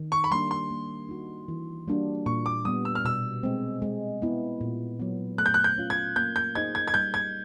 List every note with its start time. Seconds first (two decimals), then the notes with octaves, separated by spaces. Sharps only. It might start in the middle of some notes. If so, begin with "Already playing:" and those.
Already playing: D#3
0.12 C#6
0.24 B5
0.31 G3 A#3 D4 C6
0.51 C6
0.70 A#3
1.09 D#4 F#4
1.48 E3
1.88 G3 A#3 D4 F#4
2.26 A#2 C#6
2.46 D6
2.65 G3 B3 D#6
2.85 E6
2.95 F6
3.05 B2 E6
3.43 G#3 C4
3.82 G#3
4.22 B3 E4
4.61 A#2
5.00 F#3 B3
5.38 A3 F#6
5.46 G6
5.54 F#6
5.64 G6
5.78 C#4 F4
5.90 G#6
6.16 A#3 G6
6.36 G6
6.55 D#4 G#4 C5 D#5 G#6
6.75 G#6
6.88 G#6
6.94 G3 G6
7.14 G#6